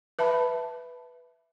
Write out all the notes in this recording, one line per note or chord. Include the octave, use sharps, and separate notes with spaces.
B4 E5 A5 B5